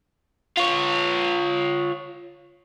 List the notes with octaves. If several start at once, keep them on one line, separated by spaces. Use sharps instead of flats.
F4 C#5